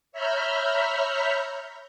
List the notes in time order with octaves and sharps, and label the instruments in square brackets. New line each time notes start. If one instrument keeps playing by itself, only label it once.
[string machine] C#5 E5 A#5 B5 F6 G6